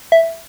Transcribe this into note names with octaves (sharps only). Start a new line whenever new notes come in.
E5